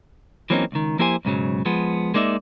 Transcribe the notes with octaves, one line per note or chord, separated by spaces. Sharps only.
E3 F#3 A#3 C4 C#4 D#4
C#2 D#3
F3 A#3 E4 G4 C5 G#5
B1 G#2 C#3 F#3
F3 G#3 B3
G#3 A#3 D#4 D5 E5